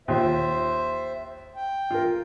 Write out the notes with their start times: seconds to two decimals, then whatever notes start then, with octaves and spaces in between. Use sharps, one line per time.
0.08 D#2 F4 C5 E5 C6
1.56 G5
1.91 F4 A#4